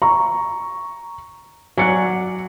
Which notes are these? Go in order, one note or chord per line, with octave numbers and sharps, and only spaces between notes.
A#5 C#6
F#3 D5 F#5 G#5 C#7